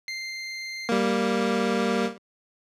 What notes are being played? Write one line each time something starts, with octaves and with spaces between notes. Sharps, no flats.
C7
G3 A#3